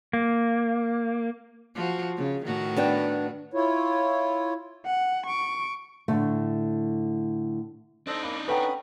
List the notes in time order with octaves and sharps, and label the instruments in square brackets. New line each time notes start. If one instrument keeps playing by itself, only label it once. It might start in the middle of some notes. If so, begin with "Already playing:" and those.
[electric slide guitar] A#3
[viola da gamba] F3 F#4
C#3
A2 D#3 F#4
[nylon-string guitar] B3 D4 G5
[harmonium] E4 F4 C#5
[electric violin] F#5
C#6 D7
[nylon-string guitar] A2 D3 A3
[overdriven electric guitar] D4 D#4 [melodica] A4 C5 D#5
[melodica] A#3 [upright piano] B5
[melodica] C#4 B5 D#6 [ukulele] A4 G5 A#5 [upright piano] B4 F#5